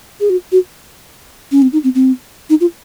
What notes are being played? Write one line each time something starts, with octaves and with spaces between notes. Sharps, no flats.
G#4
F#4
F#4
C#4
C4
D#4
C4
C4
D#4
F4